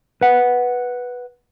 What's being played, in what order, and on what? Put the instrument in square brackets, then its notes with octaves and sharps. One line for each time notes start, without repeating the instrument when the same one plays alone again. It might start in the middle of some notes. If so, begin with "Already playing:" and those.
[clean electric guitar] B4 F#5